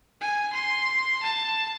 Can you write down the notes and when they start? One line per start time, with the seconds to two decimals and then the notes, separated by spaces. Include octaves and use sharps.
0.21 G#5
0.53 C6
1.23 A5